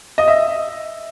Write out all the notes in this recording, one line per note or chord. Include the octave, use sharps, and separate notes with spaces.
D#5
E5